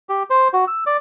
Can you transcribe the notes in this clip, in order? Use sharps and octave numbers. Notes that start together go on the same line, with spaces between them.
G4
C5
F#4
E6
D5